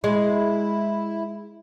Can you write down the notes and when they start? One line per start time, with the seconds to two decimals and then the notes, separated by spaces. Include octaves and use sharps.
0.04 G#3 E4